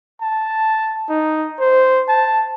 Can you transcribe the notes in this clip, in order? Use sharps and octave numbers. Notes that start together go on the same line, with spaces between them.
A5
D#4
C5
A5